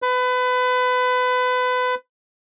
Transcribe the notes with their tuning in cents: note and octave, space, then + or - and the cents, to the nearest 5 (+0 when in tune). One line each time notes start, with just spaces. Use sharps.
B4 +25